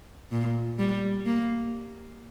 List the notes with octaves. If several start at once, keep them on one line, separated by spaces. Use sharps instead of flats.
A#2
G3
A#3